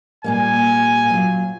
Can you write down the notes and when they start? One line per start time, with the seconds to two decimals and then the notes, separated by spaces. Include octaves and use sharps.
0.24 A#2 G3 A#3 G#5
1.10 F#3 F4